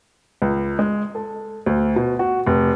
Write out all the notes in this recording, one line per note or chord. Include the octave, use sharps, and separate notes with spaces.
C#2
G#3
A4
D2
B2
F#4
F1